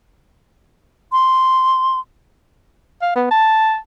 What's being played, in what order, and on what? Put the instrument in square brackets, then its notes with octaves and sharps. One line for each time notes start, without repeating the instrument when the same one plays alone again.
[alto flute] C6
[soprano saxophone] F5
B3
A5